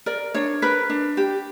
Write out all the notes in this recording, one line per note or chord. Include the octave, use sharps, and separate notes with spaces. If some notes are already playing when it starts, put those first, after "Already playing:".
A#4 D5
D4 C#5
A#4 B4
D4
G4